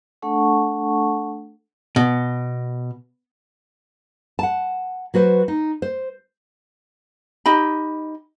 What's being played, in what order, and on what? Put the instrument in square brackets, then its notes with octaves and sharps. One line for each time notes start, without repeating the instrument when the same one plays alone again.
[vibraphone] A3 D4 A4 F#5 A5 C#6
[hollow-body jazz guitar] B2
[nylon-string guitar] F#5 A5
F#3 F#4 B4 C5
D#4
C5
[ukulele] D#4 G4 D#5 B5